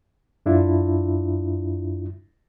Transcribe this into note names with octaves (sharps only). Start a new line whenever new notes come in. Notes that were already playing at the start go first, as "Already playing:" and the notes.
F#2 D4 E4 F4